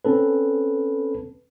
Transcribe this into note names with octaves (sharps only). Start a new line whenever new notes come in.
C4 C#4 A4 B4